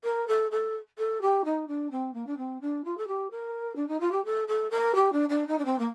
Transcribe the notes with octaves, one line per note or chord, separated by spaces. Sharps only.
A#4
A4
A4
A4
G4
D#4
D4
C4
A#3
D4
C4
D4
F4
A4
G4
A#4
D4
D#4
F4
G4
A4
A4
A#4
G4
D4
D4
D#4
D4
C4
A#3